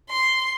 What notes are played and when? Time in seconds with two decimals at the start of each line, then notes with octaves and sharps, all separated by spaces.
0.10 C6